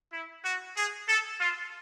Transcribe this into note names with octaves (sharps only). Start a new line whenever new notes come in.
E4
F#4
G#4
A4
F4